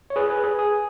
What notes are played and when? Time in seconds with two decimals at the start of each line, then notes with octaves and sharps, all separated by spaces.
0.10 C#5
0.16 G#4 B4
0.30 G#4 B4
0.44 G#4
0.59 G#4